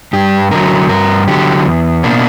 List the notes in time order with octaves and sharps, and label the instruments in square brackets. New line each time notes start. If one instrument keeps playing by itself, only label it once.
[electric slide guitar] G2 G4
D3 F#3 A#4
G2 A#4
D3 F#3 G4
E2
B2 A#3 D4